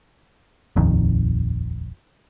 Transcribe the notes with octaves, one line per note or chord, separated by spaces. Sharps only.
D#1 A#1 F2 D#3